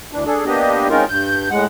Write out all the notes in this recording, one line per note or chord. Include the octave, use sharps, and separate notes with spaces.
D2 E3 D4
D4 G#4 A4
A#3 B3 D4 G4 D#5
G#3 C4 C#4 D#4 F4 A#4
G2 G6
A2 G#3 F#5